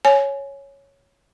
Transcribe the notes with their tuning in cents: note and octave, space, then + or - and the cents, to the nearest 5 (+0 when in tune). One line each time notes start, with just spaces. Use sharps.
C#5 +0 G#5 +15